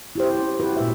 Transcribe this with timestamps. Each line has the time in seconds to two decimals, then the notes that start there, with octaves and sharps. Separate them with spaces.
0.15 E4 G4 C5
0.39 C#4
0.60 E4 F#4 G4 B4
0.77 A#2 G#3 E5